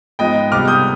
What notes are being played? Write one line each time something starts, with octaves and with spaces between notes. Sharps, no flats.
G#2 F3 G#3 B3 D#5 G5
C3 G3 B3 D6 F6
D#6 G6